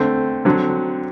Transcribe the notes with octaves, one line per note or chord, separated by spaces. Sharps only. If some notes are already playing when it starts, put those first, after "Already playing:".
Already playing: D3 A3 C4
D3 F#3 C4